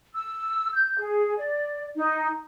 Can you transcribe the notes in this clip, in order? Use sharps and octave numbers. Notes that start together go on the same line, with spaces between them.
E6
G6
G#4
D5
D#4